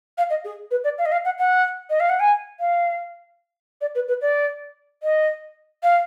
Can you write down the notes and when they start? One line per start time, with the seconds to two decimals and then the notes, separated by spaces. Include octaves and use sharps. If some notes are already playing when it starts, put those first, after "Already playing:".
0.18 F5
0.30 D#5
0.45 G#4
0.71 B4
0.84 D5
0.98 F5
1.06 D#5
1.12 F5
1.25 F#5
1.38 F#5
1.90 D#5
2.00 F5
2.09 F#5
2.20 G#5
2.60 F5
3.81 D5
3.95 B4
4.08 B4
4.22 D5
5.03 D#5
5.83 F5